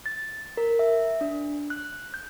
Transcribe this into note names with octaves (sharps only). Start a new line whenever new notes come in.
A6
A#4
E5
D4
F#6
G6